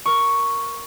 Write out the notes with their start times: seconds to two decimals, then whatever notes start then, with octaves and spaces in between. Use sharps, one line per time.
0.06 A#4 C#6